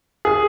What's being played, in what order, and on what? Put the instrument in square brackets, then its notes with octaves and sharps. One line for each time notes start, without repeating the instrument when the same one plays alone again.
[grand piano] G#4